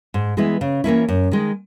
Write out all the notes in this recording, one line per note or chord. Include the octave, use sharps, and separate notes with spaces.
G#2
E3 G#3 B3 E4
C#3
E3 A#3 C#4 E4
F#2
D#3 G#3